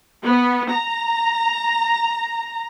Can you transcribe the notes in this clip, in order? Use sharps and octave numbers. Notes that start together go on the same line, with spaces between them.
B3
A#5